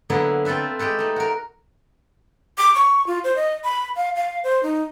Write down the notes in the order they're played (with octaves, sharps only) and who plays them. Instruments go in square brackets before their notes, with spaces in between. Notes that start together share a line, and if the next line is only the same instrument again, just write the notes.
[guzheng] D3 F#3 A#3 B3 E4 B4
C4 F4 A4 B4 E5
G#3 G4 A4 B4
A3 D#4
F#4 A#4
[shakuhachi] D6
C#6
F4
C5
D#5
B5
F5
F5
C5
D#4